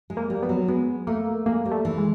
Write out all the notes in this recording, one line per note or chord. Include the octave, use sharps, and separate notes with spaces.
G#3
A#3
G3
F3 B3
F#3
G#3 B3
A3 A#3
G#3 A#3
G3
A3
E3
G#3